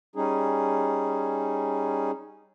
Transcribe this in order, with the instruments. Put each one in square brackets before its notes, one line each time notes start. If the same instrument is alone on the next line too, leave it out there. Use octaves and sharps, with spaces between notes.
[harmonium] G3 C#4 D#4 G#4